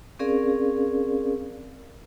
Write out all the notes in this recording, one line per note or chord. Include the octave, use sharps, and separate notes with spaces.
C4 C#4 G#4 A#4 D5 F5